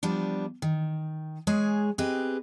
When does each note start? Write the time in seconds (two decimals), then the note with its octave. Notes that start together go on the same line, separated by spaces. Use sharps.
0.03 F3 G3 B3 D4
0.62 D#3
1.47 G#3 G#4 C#5 G#5
1.98 C4 G4 G#4 B4 D#5